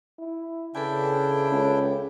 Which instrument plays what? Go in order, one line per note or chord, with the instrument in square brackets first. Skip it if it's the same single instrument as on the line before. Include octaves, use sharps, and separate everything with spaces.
[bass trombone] E4
[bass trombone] C#3 [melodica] D4 E4 G5 [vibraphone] A4 B4 G#5
[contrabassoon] C#2